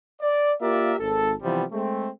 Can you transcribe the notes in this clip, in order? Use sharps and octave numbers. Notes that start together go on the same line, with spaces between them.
D5
A#3 F4 G4 A#4 D5 E5
G#1 A4
C3 E3 F3 G3 B3 C4
G#3 A3 C4